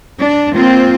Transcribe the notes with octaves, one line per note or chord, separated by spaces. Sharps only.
D4
A#3 C4 F4